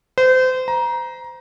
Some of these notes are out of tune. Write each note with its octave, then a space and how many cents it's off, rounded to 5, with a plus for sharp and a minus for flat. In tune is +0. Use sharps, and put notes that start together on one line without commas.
C5 -30
A#5 +20